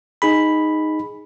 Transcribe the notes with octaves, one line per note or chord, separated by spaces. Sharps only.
D#4 G#4 B5